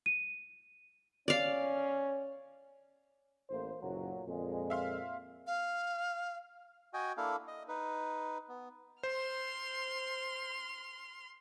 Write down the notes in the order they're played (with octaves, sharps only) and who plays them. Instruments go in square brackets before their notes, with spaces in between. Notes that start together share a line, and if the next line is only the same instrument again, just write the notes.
[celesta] D#7
[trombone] C#4 [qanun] D5 F5
[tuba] A1 [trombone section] A2 A#3 C5
[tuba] F#1 [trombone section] B1 A#2 F#3
[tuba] F2 [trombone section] A#2 G#3
[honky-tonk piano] E5 F5 C6
[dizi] F5
[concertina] F#4 D#5 G5 G#5
A#3 D4 E4 A4 F5
D#5
D#4 B4
B3
[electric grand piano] C5 [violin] C6 F6